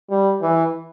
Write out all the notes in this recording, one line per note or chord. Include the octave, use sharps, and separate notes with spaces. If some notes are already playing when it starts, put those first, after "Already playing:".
G3
E3